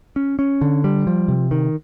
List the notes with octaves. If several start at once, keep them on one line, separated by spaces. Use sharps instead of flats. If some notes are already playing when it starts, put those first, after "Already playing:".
C#4
C#4
D3
G3
F3
C3
D#3